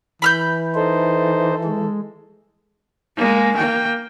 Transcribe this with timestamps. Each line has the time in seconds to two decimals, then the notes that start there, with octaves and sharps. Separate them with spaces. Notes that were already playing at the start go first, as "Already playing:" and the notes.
0.22 E3 B5 F6 G6
0.75 D#4 A4 C5
1.65 G#3
3.16 G#3 A#3
3.56 A#3 G5